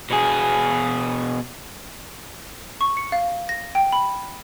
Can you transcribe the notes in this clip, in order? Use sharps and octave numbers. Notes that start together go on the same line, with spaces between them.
B2 G#4
C#6
C#7
F5
A#6
G5
B5